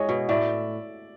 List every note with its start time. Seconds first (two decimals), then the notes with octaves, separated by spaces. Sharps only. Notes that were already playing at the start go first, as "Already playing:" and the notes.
Already playing: G#3 E4 C#5 D#5
0.09 B2
0.29 A2 D5 E5